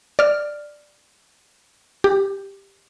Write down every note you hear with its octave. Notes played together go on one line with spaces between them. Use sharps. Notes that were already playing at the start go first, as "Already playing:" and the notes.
D5 F6
G4